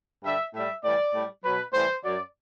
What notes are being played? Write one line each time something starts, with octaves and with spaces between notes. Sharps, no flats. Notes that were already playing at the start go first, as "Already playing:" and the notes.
G2 D3 G3 E5
A2 G3 E5
A2 E3 G3 D5
A2 G3
B2 F#3 B4
A2 E3 G3 C5
F#2 F#3 D5